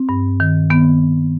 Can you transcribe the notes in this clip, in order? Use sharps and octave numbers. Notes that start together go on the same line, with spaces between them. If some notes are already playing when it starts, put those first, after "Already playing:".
Already playing: C4
G2
D#3
D#3 B3